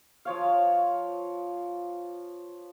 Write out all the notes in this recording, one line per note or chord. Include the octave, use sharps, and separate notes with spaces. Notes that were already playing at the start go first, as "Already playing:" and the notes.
F3 C#5 F5